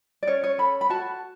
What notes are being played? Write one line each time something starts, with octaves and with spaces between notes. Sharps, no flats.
D5
C#4 C#5
C#5
A4 B5
B5
F#4 A5